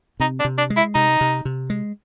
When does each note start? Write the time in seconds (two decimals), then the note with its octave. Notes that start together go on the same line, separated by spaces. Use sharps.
0.20 C3 D#4
0.40 D4
0.45 C3
0.58 D4
0.70 G#3
0.77 E4
0.95 C3 D#4
1.21 C3
1.45 C3
1.70 G#3